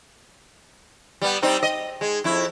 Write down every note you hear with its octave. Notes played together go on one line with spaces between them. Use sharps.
G3 B3
G3 C4 D#4
D#5
G#3
F2 E4